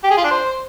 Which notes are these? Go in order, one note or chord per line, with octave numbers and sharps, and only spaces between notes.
G4
G#4
F4
D4
C5